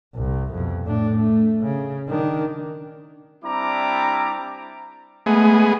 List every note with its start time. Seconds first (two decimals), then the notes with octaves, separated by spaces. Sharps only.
0.15 C2
0.53 F2 B2
0.83 A2 D4
1.17 A3
1.62 C#3
2.08 D#3 D4
3.45 G3 C4 D4 E4 A#5 D6
5.26 G#3 A3 B3 G#4